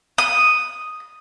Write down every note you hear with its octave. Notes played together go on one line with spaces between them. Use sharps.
D#6